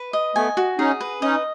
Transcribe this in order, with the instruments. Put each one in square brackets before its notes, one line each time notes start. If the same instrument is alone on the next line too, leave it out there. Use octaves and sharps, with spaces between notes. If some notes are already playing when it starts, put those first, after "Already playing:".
Already playing: [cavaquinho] B4
D#5
[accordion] A3 B3 [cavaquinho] G#5
[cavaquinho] F#4
[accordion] C#4 D#4 [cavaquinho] G#4
[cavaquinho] B4
[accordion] C#4 D#4 [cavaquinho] D#5